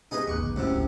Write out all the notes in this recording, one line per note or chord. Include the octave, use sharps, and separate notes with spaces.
C3 B3 D#4 G#4 B4
D#2 G#2 C#6 D6 F#6
D3 B3
F#2 A2 C3 E6
D2 D4